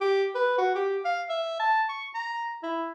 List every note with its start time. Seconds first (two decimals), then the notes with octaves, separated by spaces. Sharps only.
0.01 G4
0.35 B4
0.58 F#4
0.75 G4
1.05 F5
1.29 E5
1.60 A5
1.89 C#6
2.15 A#5
2.63 E4